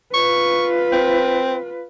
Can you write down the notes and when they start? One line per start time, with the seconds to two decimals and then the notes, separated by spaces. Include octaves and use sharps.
0.14 F4 B4 C#6
0.92 C4